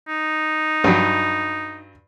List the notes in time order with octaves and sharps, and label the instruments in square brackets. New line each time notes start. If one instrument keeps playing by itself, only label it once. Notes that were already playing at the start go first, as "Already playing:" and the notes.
[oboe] D#4
[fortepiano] G2 F#3